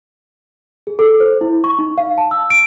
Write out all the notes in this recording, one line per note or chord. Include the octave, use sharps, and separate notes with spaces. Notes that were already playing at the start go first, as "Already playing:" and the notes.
G#4
A4
C5
E4
C#6
D#4
F5
A5
E6
D7